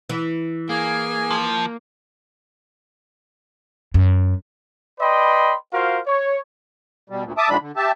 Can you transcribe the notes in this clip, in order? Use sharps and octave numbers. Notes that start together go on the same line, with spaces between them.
E3
A#3 G#4 G#5
F3
F#2
B4 D5 D#5 G5 B5 C6
F4 F#4 A#4 C5 F5
C#5
B2 G3
D2 A#2
E5 A5 D6 D#6
A#2 D#3 F3 G#3 D4 B5
D3
G4 E5 A5